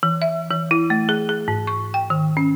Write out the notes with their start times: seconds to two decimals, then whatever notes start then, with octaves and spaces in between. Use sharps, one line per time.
0.03 E3
0.22 E5
0.50 E3
0.71 E4
0.90 A3
1.09 G#4
1.29 G#4
1.48 G#2
1.67 C#6
1.94 G5
2.10 D#3
2.37 C#4